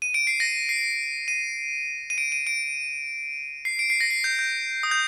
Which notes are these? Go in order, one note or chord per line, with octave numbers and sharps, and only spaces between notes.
D#7
D7
C7
A#6
C7
D#7
D#7
D7
D#7
D7
C7
D7
C7
A#6
C7
G6
G6
D#6
G6